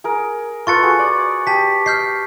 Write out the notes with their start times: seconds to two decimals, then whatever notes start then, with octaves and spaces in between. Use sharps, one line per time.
0.04 G#4 A#4
0.67 F4 A4 B4 C#6 A6 C#7
0.82 F#4 G#4
0.99 D5
1.47 G4 A5 B6
1.86 D#5 F6 G6 C7